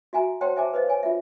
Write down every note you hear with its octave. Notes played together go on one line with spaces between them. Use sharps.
F#4 E5 G#5 A#5
C5 C#5 F#5 G5 A5 C6
C5 E5 G#5 A5 D6
B4 C5 D#5 F5
C#5 G#5
F4 E5